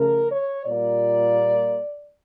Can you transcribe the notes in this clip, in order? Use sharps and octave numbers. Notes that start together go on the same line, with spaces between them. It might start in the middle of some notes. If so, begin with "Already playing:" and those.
Already playing: C#3 F3 A3 A#4
C#5
A#2 G3 A#3 D5